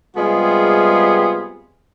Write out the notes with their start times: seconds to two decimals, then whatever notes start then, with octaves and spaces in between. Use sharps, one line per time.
0.16 C3 G3 G#3 B3 F4 G#4